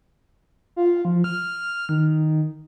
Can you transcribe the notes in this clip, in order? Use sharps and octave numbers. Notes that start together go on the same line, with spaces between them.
F4
F3
F6
D#3